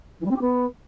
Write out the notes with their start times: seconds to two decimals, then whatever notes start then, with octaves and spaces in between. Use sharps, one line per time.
0.19 E3
0.25 G3
0.30 C4
0.35 G4
0.41 B3